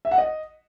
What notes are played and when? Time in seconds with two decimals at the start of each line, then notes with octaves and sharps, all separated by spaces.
0.05 E5
0.11 F#5
0.18 D#5